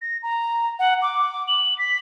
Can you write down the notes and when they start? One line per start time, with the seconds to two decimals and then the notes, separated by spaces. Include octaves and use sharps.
0.02 A#6
0.23 A#5
0.79 F#5
1.02 D6
1.48 F#7
1.78 B6